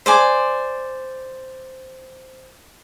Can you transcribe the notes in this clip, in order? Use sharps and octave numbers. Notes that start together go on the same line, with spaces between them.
C5 D5 G#5